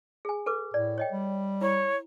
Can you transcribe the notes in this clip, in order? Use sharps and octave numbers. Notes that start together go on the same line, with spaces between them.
G#4 G#5
A4 B4 D6
A2 D5
C#5 D#5 G5
G3
E4 C#5